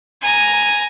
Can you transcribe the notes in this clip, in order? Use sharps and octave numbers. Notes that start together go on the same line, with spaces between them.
G#5 A#5